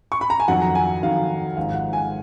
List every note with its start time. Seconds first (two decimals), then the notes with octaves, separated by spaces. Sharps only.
0.12 C#6
0.21 B5
0.30 A#5
0.40 G#5
0.48 F2 D#3 F#3 F#5
0.62 A#5
0.75 G#5
1.02 F2 D#3 F#3 F5
1.57 G#1 G#2 F3 F5
1.75 F#5
1.93 G#5